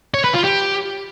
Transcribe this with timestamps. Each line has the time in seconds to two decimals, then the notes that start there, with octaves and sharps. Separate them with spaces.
0.14 C#5
0.24 B4
0.34 F4
0.44 G4